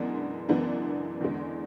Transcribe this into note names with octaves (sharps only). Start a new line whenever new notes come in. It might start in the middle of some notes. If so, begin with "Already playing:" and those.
Already playing: F#2 E3 G#3 B3 D4
F#2 C#3 E3 G#3 B3 D4
E2 D3 G#3